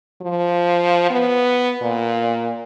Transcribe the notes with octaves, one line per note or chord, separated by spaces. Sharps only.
F3
B3
A#2